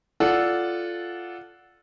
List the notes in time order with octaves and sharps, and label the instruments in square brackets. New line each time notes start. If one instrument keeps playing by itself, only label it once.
[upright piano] F4 A4 D5 F#5